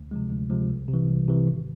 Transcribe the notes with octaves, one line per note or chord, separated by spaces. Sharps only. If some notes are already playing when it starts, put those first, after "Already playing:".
Already playing: D2
C3 F3 G#3
D2
C3 F3 G#3
C2
C3
E3
C2
C3 E3
G#1